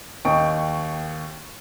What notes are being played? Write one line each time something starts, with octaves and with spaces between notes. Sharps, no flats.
D#2 D#5 G5 C#6 D7